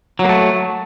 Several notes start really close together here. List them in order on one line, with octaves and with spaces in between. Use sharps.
F#3 A#3 A3